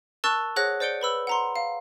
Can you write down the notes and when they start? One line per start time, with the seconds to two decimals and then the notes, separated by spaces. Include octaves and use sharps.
0.24 A#4 A5 C#6 E6 F#6 A6
0.56 G#4 C5 C#5 F#5 F#6 A#6
0.80 C5 D5 G6 C#7 D7 G7
1.01 B4 B5 E6
1.27 F#5 A#5 C6
1.56 F5